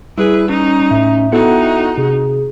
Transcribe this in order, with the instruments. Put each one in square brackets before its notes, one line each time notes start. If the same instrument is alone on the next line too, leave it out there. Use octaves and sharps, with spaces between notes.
[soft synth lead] G3 [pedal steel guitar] E4 [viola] G#4 B4
[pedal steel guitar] C#4 A#5 [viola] D#4
[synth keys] A2 [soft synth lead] E5
[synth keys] B3 E4 A4 [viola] D#4 F#4 [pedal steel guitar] F#5 G5
[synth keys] C3 [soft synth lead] G#4